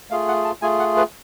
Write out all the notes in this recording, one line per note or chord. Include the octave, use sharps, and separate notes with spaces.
A3 F4 G#4 F5
F#5
A5
A3 F4 G#4 G#5
F#5
B4